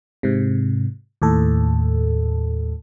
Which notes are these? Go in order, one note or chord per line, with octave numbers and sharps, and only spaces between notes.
G#2 C3
D#2 A2 A4